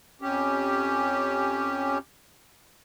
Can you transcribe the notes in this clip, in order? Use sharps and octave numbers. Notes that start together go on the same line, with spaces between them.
F2 C#4 G4